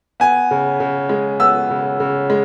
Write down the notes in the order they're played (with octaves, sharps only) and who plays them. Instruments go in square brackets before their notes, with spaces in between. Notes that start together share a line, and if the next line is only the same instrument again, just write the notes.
[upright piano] B3 G#5
C#3
C#3
G#3
B3 E6
C#3
C#3
G#3